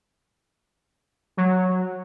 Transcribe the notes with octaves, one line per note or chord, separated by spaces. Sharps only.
F#3